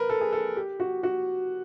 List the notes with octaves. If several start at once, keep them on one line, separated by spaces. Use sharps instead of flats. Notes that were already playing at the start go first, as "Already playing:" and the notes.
Already playing: A#4 B4
A4
G#4
A4
G4
F#4
F#4